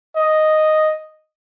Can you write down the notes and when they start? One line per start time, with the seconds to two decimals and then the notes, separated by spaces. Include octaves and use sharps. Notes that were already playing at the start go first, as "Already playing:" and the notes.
0.16 D#5